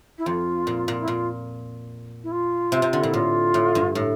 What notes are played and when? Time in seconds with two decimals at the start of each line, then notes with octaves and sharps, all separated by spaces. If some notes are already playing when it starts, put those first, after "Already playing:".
0.18 E4
0.26 F2 F4
0.67 A#2
0.88 A#2
1.00 E4
1.08 A#2 F4
2.24 E4
2.31 F4
2.72 C3
2.82 C3
2.93 D3
3.02 A#2 E4
3.14 A2 F4
3.54 A2
3.75 G2
3.95 A2